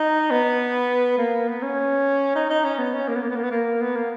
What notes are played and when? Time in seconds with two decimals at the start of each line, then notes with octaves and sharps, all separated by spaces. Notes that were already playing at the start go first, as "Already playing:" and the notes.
Already playing: D#4
0.31 B3
1.18 A#3
1.48 B3
1.62 C#4
2.35 D#4
2.50 D#4
2.64 C#4
2.79 B3
2.94 C#4
3.08 A#3
3.16 B3
3.23 A#3
3.30 B3
3.36 A#3
3.44 B3
3.51 A#3
3.81 B3
3.96 A#3